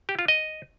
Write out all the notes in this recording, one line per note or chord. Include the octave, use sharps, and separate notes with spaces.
G4
F4
D#5